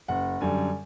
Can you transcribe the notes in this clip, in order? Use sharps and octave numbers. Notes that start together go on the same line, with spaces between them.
F#1 F#5
F#2 D3 G3 G#5